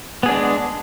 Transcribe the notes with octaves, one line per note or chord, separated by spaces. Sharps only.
G#3 B3 D4 G#4